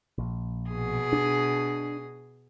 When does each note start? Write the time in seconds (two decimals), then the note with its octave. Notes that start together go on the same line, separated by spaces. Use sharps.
0.18 A#1
0.70 B2 G#4
1.13 D4